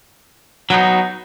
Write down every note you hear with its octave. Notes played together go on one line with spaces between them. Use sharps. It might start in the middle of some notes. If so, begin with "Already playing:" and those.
F#3 B3 D#4